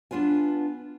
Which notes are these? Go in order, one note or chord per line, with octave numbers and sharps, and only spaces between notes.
B3 D4 F4 B4 G#5